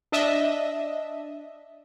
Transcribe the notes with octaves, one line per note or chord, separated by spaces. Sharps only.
D4 D#5 E5